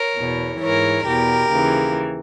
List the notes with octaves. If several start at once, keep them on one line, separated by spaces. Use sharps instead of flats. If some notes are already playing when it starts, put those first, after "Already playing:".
Already playing: A#4 C#5
E2 B2
G#2 E3 A#4 C#5
E2 B2 G4 A#4
D#2 C#3 E3